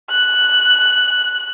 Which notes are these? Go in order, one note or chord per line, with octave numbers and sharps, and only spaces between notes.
F#6